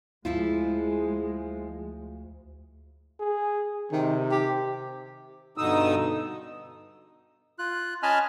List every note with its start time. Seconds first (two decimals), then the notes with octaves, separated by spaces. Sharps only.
0.25 D2 F3 G#3 E4 F4
3.19 G#4
3.92 C3 D#3
4.31 G4
5.58 G2 B2 D3 D#4 D#6 E6
7.59 F4 F#6
8.03 C#4 D#5 G#5 A5 B5 F6